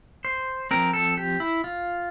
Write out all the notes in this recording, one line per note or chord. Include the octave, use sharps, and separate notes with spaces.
C5
F3 C4 A#4
A4
G4
E4
F4